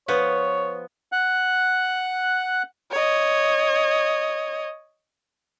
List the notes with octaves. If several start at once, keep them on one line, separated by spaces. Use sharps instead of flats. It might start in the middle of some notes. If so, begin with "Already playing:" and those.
F3 B3 C#5
F#5 F#6
C#5 D#5